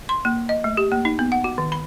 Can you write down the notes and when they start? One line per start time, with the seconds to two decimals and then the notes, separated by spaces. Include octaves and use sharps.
0.09 C6
0.25 A#3
0.49 D#5
0.64 A3
0.77 G4
0.92 A#3
1.05 D#4
1.19 B3
1.32 F#5
1.44 F#4
1.58 D#3
1.72 B5